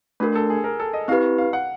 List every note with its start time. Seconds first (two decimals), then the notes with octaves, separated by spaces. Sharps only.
0.20 A3 D4 F#4 A#4 B4
0.35 A4
0.50 G#4
0.64 A#4
0.80 A4
0.93 D#5
1.08 C4 E4 G4 B4 F5
1.38 F5
1.53 F#5